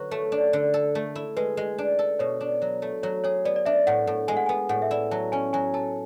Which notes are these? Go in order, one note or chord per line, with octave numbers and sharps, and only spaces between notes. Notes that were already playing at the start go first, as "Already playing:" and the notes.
Already playing: D3 F#3 F#4 B4
A3 C#5
D4
D3
A4
A3
E4
G#3 B4
G#3
D4
A4
B2 C#5
D4
F#3
A3
F#3 C#5
G#4 C#5
B3 D5
D5
D4 E5
A2 F#5
A2
G#3 G#5
F#5
B3 G#5
A2 F#5
E5
E4 D5
F#3 A5
C#4 G#5
F#3 G#5
A4 A5